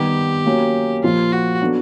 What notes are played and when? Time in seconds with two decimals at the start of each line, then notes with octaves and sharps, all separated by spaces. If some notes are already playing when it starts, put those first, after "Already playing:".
Already playing: D#3 G3 B3 G4
0.45 F#3 A#3 C#4
1.03 A#2 F3 A#3 F4
1.32 F#4
1.61 F#3 B3 D4 F#4 A4